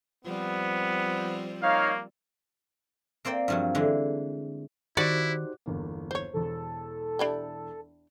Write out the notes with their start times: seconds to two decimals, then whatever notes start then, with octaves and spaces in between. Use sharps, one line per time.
0.25 F3 G3 B3 C4
1.63 A#3 D#4 C#5 F5
3.25 A#3 C4 D5 G5
3.48 G2 F3 F#3
3.75 D3 E3 G#3
4.97 D#3 D#4 E4 F#4 G4 C5 D5
5.66 G1 E2 A#3
6.11 C5 C#5
6.33 E1 E2 A4
7.19 D4 E4 G4